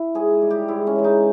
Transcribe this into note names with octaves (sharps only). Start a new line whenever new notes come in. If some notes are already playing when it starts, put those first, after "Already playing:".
Already playing: E4
G#2 G#4
G3
G4
G#2 E4
C#4
E3 G#3
D#4